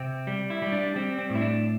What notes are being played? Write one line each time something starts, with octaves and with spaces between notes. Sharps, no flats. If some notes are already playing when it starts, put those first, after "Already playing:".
Already playing: C3 C4
G3
E4
G3
D4
G3 C4
C4
A2
E4
D4